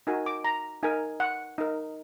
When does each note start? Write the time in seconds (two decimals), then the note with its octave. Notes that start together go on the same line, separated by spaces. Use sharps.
0.07 D#4 F#4 A#4 G#5
0.26 D6
0.44 A#5
0.83 D#4 A#4 G#5
1.20 F#5
1.58 D#4 A#4